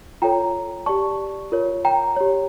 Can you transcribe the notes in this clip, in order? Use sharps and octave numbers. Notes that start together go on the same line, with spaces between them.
F4 A4 C#5 G5 A#5
G4 D5 A5 C#6
F4 A#4 C#5
G5 A#5
G4 C#5